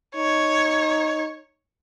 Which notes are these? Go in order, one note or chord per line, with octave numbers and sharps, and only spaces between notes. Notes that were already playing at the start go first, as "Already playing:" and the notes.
D#4 C#5